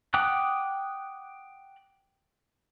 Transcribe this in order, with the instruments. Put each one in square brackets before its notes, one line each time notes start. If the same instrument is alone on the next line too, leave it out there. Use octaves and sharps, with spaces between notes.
[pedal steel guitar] F#5 G5 D6 D#6 F#6